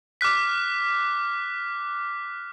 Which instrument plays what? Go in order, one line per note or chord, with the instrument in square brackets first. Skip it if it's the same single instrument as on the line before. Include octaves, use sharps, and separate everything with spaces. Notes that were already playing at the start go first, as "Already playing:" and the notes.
[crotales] D6 F6 F#6 B6